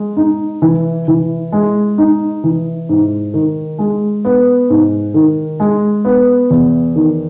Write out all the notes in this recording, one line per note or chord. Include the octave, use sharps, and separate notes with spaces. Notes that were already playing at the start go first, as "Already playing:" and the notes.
Already playing: G#3
D#4
E3
E3
G#3
D#4
E3
G#2
D#3
G#3
B3
G#2
D#3
G#3
B3
E2
D#3